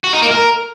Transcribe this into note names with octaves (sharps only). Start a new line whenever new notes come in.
F#4
D#4
A#3
A#4